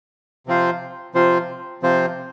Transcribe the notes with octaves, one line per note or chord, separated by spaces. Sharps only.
C3 F3 C4 F4 C5
C3 F3 C4 F4 C5
C3 F3 C4 F4 C5